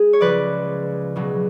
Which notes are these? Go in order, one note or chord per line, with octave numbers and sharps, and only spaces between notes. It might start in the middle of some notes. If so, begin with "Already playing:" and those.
Already playing: G#3 G#4
C#5
C#2 C#3 F3 B4 D5
C#2 B2 F#3